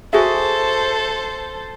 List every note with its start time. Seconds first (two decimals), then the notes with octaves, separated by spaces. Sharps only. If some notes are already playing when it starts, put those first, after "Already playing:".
0.13 F#4 G#4 A4 C5 E5